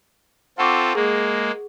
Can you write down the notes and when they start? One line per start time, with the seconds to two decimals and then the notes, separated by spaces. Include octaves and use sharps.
0.58 C4 F4 A4 F#5 C#6 D6
0.95 G#3 A#3 G#4